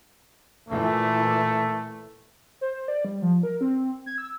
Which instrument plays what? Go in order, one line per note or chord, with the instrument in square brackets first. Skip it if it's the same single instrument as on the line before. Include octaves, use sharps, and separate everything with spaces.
[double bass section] A#2 E3 [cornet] A3
[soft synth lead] C5
D5
G3
F3
A#4
C4
G#6
E6